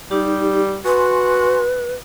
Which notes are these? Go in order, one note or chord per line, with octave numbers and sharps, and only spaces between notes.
G3 D#4 G4
F#4 B4 G#5 C6